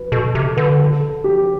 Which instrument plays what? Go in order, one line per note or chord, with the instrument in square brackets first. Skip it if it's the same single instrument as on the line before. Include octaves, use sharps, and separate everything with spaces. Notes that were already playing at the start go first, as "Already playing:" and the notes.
Already playing: [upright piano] B4
[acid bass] B2 [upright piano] A4
[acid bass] C3 [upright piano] A4
[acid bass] D3 [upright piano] B4
[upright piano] A4
G4